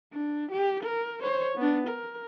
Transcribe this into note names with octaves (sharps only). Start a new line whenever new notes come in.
D4
G4
A#4
C5 C#5
B3 D4
A#4